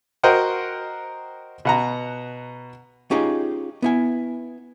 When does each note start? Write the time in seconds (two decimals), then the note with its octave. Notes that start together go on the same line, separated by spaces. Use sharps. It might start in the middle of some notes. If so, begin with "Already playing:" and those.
0.23 F#4 A#4 C5 D#5 F#5 G5
1.65 B2 F#5 A#5
3.11 C#4 D#4 F4 G4 G#4 A#5
3.82 B3 E4 G#5